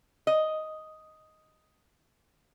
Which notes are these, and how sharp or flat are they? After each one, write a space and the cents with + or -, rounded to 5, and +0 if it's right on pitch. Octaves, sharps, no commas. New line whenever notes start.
D#5 +5